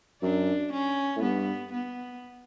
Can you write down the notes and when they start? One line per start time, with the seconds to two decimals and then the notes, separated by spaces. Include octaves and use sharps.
0.22 F#2 D4
0.73 C#4
1.16 A2
1.22 G2 B3
1.73 B3